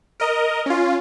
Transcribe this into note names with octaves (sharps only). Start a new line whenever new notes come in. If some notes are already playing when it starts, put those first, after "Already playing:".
A#4 D#5
C#4 F4